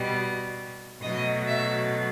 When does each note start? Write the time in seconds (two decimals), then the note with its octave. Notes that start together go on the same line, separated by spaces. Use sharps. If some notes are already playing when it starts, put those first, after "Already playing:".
Already playing: B2 G3
1.01 B2 F#3 A3 D#5
1.47 E5